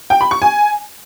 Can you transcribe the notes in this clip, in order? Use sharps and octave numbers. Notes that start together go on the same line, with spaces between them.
G5
B5
C#6
G#5